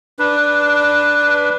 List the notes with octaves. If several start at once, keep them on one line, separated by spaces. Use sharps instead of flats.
D4 B4